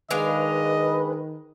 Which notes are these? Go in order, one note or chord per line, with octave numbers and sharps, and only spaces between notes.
D#3 G#3 D4 B4 D#5 F5